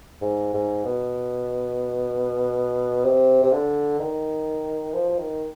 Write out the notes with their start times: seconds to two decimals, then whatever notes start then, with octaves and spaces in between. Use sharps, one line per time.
0.21 G#2
0.53 G#2
0.84 B2
3.04 C3
3.43 C3
3.52 D3
3.99 D#3
4.94 F3
5.09 F3
5.18 D#3